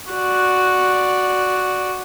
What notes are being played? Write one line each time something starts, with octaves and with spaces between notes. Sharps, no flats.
F#4 D5